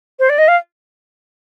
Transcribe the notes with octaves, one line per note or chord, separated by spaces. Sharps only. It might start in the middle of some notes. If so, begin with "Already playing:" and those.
C5
D5
D#5
F5